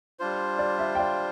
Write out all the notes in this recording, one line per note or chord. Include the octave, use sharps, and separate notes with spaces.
G3 D4 F4 C5
D5
E5
G5
D5 F5